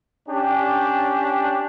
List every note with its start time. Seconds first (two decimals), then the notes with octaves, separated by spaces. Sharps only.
0.27 C#4 D4 G4